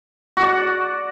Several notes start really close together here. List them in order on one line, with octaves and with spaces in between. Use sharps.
F#4 F#5 D5